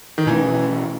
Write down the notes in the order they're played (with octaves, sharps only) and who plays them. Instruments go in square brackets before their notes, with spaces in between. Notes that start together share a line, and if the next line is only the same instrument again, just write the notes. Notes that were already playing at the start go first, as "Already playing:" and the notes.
[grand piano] D#3
[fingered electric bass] B2 A3 C#4 [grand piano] E3